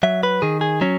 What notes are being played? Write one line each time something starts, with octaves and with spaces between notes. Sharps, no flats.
F#3 E5
B4
D#3 G#4
G#4
F#3 C#4